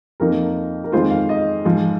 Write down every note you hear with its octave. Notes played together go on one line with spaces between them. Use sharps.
F2 F3 A#3 D#4 A#4
A#4
F2 D#3 G#3 F4 C5
F5
D#5
G#2 F3 G#3